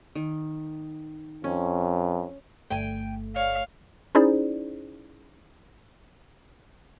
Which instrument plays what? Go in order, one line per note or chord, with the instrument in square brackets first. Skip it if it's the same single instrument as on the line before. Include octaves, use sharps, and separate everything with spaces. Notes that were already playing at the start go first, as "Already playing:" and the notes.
[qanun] D#3
[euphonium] F2 [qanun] C#4
[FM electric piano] G1 A3 [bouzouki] G5 G#5
[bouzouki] C#5 [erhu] F5
[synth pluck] C#4 D#4 E4 G#4 C5 D5